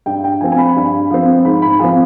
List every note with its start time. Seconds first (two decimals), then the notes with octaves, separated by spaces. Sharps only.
0.06 G2 G5
0.24 G5
0.41 F3 C4 G#5
0.52 G#5
0.58 B5
0.76 G2
1.11 F3 C4
1.45 G#2 B5
1.62 B5
1.79 F3 C4 G#5